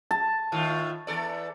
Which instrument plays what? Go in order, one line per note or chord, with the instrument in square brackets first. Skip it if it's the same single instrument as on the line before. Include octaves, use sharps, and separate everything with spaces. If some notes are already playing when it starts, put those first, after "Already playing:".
[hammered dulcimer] A5
[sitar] A2 D#3 F4
E2 A4 D5